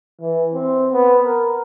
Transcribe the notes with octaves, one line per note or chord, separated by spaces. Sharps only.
E3
C4
B3
A#4